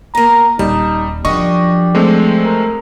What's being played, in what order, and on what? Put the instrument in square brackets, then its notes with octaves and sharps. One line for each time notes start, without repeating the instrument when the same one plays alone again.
[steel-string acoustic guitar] A#3 B3 [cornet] A#5
[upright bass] D#1 [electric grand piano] G3 [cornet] D#4 [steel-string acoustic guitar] A5
[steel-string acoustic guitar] F#2 G3 D4 [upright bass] F3 [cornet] G4 [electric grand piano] D#5 C#6
[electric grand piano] G#3 A3 C4
[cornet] A#4